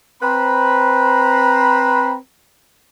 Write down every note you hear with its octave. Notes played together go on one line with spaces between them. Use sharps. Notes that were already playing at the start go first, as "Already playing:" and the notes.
C4 B4 C5 A#5 B5